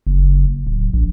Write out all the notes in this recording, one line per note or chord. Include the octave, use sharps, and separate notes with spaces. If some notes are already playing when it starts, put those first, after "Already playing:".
F#1
D1
A#1